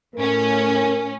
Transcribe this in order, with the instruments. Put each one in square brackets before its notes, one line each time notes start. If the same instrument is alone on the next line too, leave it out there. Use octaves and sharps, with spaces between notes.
[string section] A2 C#4 [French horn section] A3 A#4